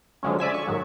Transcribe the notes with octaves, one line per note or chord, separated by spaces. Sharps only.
D3 F3 F#3 G#3 C#4
D5 E5 G#5 B6
C#6
G#2 D#3 F#3